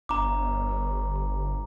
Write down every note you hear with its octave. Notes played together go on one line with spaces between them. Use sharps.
G1 A#5 D6